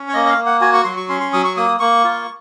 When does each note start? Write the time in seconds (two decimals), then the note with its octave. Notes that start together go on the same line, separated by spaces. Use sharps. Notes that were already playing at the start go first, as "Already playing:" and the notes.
Already playing: C#4
0.08 C#5
0.14 A#3 D#5
0.26 D#5
0.29 F5
0.38 A#3
0.46 F#5
0.61 F#4 G#5
0.74 C#6
0.85 F#3 C6
0.97 C#6
1.09 C#4 C6
1.20 C6
1.33 F#3 D#6
1.45 C#6
1.57 A#3 D#6
1.80 A#3 C#6
2.05 F4